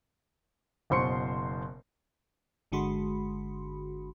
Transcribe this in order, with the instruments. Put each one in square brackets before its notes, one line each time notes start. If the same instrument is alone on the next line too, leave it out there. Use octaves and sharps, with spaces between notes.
[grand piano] F#1 B2 C5 C6 C#6 C#7
[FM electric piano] G1 D3 G#3 F#4 B5 C6